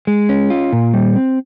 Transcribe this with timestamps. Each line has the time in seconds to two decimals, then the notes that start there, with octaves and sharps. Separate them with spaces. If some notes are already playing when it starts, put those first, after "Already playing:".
0.07 G#3
0.29 C#4
0.50 F4
0.73 A#2
0.94 G3
1.16 C4